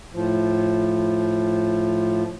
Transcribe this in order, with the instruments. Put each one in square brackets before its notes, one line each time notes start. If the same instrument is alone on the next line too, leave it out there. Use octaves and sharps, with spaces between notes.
[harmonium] A2 F3